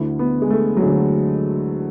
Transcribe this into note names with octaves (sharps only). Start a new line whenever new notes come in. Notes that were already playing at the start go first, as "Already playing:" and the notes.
Already playing: D2 D3 E4
B3
G#3
A3
F#3
D2 D3 G#3